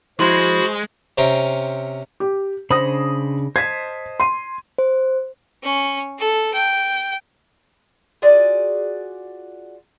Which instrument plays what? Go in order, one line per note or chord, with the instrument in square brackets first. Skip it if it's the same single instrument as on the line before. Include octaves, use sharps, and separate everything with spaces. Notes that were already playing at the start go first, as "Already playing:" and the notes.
[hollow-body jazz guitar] F3 E4 C6 [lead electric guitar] G#3 [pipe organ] F#4 B5 [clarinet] C5
[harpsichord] C3 C4 C#4 A#4
[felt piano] G4
[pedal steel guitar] C#3 D4 B5 [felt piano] C5 D#6 A#6
[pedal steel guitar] C5 D#5 A5 [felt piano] G#6 B6
[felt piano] C6 D#7
[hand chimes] C5
[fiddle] C#4
A4
G5
[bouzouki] F4 F#4 G#4 D5